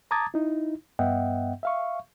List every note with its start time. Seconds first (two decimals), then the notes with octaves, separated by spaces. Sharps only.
0.11 A5 A#5 D6 D#6 G#6 A6
0.34 D#4 E4
0.99 G2 B3 D#5 E5 F#5 G5
1.63 E5 F5 C#6